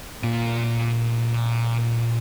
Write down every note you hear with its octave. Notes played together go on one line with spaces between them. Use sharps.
A#2 F4